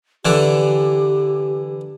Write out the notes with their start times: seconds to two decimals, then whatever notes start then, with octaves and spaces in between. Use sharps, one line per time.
0.25 D3 E3 D4 G4